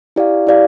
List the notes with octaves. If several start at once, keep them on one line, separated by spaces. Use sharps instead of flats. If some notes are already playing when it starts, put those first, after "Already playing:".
E4 G4 D5 F5
E4 G4 D5 F5